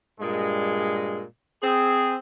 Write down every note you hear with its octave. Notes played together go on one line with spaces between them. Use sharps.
G2 A#2 G#3
C4 G#4